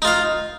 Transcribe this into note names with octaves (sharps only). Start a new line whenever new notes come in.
D#4 F4 F5